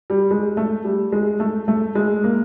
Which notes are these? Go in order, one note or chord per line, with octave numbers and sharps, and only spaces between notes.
G3
G#3
A3
G3
G#3
A3
A3
G#3
A#3